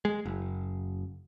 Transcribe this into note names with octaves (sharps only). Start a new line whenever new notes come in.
G#3
F#1